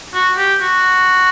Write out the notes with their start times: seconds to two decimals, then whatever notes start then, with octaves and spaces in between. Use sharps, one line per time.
0.15 F#4
0.37 G4
0.61 F#4